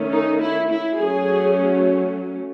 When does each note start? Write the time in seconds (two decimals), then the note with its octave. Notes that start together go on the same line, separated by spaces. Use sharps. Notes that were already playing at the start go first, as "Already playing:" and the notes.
Already playing: D#3 A3 C#4
0.12 D#4
0.41 E4
0.70 E4
0.98 F#3 A3 C#4 G#4